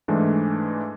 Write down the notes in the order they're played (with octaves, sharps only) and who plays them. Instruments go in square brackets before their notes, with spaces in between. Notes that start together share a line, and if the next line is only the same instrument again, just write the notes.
[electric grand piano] G#2 E3 G#3 A3 D4